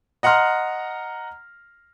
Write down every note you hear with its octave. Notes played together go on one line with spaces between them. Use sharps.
D#5 F#5 A#5 C6 F6